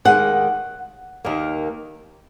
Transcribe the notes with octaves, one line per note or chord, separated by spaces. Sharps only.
D#2 D#3 G#3 F#5
D#2 D#3 A#3